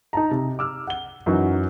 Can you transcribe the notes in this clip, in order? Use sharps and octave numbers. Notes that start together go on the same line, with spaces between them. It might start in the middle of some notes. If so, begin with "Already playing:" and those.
D#4 A5 A#5
C3
D6 E6 F6
F#5 G7
F#2 E3 D#4 F#4 F#5